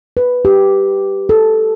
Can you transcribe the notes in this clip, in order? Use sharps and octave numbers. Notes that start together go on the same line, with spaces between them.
B4
G4
A4